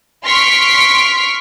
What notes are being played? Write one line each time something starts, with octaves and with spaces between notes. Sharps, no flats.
C6 C#6 F6 B6 D7